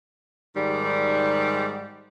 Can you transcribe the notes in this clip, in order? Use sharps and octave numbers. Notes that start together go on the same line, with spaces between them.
G#2 D#3 G3